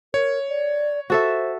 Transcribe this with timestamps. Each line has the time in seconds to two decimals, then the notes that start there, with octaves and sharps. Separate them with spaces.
0.14 A#4 C#5
0.49 D5
1.10 F#4 A4 C5 E5